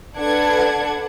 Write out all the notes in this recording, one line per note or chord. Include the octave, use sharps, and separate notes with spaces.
D4 A4 B4 F#5 G#6